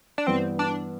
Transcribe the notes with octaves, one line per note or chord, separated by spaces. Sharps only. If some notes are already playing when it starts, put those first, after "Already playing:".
D4
G2 E3 B3 C4
D4